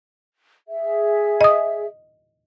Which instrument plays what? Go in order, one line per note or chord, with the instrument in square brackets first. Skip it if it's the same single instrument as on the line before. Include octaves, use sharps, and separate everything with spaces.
[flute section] G#4 E5
[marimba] D#5 D#6